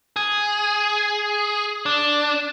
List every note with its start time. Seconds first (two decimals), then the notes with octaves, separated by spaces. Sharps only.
0.16 G#4
1.86 D4